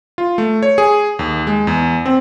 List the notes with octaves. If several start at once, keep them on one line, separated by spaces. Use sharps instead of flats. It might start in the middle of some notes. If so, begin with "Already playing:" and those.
F4
A3
C#5
G#4
D#2
G#3
E2
C4